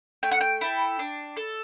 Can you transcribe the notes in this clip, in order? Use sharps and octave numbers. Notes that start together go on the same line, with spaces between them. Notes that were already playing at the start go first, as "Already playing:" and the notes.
A3 G5
F#5
G5
E4 A4
D4
A4